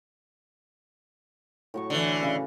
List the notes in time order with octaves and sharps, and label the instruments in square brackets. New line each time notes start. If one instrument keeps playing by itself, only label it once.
[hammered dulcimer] A2 F#3 C#6
[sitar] D3 E3
[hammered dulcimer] C#3 B4